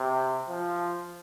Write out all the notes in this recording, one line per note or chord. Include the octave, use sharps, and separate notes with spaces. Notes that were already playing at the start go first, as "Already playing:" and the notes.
Already playing: C3
F3